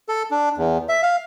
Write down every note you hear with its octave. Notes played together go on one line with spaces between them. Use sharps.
A4
D4
E2
E5
F5